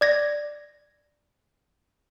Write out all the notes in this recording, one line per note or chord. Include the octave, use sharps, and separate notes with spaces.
D5 G#6 A#6